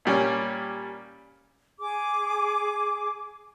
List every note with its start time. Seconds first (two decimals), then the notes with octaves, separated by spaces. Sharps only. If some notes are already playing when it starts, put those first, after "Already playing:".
0.05 A#2 G3 C#4
1.79 G#4 D6